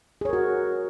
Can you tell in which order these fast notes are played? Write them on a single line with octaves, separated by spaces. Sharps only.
G#4 C#5 A#4 F#4